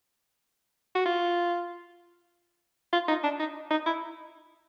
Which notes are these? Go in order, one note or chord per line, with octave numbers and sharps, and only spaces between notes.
F#4
F4
F4
D#4
D4
D#4
D#4
E4